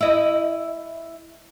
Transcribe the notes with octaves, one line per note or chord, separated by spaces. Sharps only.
E4 D#5